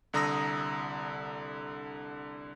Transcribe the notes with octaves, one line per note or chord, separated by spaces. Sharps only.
C2 D3 A#5 D#6 E6 A#6